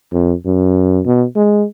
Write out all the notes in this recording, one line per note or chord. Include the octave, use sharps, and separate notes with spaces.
F2
F#2
B2
G#3